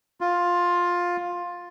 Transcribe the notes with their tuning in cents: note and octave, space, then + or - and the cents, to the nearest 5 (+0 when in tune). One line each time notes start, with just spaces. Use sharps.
F4 +10